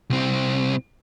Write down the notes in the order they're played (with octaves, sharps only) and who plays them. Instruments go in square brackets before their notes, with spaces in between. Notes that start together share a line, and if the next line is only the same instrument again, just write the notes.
[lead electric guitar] C2 C4